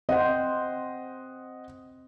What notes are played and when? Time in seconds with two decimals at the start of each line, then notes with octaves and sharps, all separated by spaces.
0.09 C4 C5 D#5 F#5